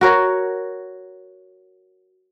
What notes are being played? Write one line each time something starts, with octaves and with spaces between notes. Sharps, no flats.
F#4 A#4 C#5